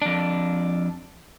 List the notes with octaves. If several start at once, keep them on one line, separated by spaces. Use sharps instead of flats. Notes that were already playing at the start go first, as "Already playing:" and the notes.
F2 D4